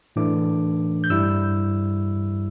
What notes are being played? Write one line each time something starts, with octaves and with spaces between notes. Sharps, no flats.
A2 E3 A3 D4 D6
G6
G2 G3 E4 E6